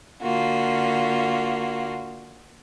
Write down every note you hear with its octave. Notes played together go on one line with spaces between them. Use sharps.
D3 A#3 F4 F#4